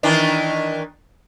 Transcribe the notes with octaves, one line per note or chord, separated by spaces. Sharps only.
D#3 E3 D4